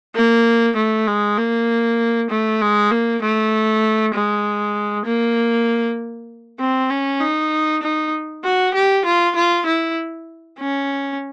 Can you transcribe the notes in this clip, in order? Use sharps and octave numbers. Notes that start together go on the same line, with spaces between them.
A#3
A3
G#3
A#3
A3
G#3
A#3
A3
G#3
A#3
C4
C#4
D#4
D#4
F#4
G4
F4
F4
E4
C#4